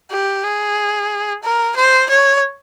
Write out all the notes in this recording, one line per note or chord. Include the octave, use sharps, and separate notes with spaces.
G4
G#4
A#4
C5
C#5